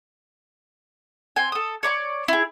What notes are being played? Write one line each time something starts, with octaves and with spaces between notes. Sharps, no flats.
C4 G5 G#5
A4 D#6
C#5 D5 A#5 C#6
E4 G#4